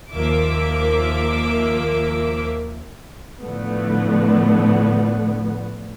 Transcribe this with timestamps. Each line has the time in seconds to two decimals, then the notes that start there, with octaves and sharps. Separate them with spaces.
0.13 D#2 F3 A#3 E5 D6
3.42 A2 D3 F3 A3 B3